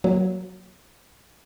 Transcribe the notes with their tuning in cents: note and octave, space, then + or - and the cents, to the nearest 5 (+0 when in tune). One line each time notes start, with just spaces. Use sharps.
F#3 +0 A#3 +0